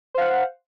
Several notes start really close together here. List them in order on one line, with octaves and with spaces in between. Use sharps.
C5 F5 F#5